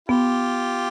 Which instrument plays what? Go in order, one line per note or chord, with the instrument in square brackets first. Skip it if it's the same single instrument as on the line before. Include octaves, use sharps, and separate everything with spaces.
[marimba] B3 [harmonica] F4 G4